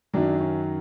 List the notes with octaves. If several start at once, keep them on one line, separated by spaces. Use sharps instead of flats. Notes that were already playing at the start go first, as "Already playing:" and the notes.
F#2 D#3 F#3 D4
C#4